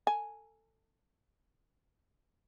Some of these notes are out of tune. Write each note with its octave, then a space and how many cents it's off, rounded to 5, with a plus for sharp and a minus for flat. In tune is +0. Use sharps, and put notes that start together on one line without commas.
A4 +20 G#5 +0